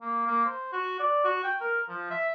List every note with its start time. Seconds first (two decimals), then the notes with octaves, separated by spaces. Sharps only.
0.01 A#3
0.27 A#3
0.46 C5
0.72 F#4
0.99 D5
1.24 F#4
1.44 G5
1.61 A#4
1.88 F3
2.11 E5